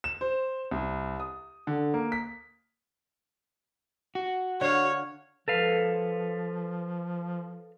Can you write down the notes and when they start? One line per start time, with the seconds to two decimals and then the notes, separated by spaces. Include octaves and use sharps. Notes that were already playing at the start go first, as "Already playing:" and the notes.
0.04 E7
0.21 C5
0.71 C2
1.20 D#6
1.67 D3
1.94 A#3
2.12 B6
4.15 F#4
4.61 D3 C#5 F5
5.48 F3 A4 B4 F5